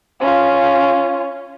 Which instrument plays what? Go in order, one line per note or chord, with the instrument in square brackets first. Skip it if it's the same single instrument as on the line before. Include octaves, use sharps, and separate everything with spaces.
[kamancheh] C#4 F4